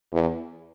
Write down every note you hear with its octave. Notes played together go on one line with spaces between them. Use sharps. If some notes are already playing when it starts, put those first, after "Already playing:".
E2